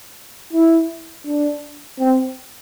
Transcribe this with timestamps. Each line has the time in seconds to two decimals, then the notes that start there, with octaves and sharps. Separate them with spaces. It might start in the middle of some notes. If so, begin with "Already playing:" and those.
0.53 E4
1.26 D4
1.99 C4